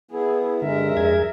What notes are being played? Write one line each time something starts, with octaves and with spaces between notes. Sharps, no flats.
B3 E4 G#4
G2 D3 G#3 A#4 E5
F2 G#4 G#6